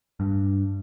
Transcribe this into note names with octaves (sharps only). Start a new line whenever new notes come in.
G2